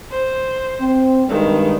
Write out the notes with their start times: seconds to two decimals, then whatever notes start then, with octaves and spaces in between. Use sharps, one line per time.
0.11 C5
0.81 C4
1.29 G2 D#3 G#3